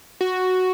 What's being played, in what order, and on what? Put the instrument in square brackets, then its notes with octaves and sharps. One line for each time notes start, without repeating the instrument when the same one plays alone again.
[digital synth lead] F#4